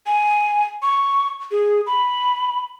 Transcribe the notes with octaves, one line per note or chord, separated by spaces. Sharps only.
G#5
C#6
G#4
B5